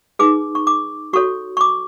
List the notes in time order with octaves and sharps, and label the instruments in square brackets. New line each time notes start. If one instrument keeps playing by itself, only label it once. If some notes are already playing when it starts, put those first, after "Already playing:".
[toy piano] D#4 G#4 B4 D6
C#6
D6
F#4 A4 C#5 C#6
C#6
D6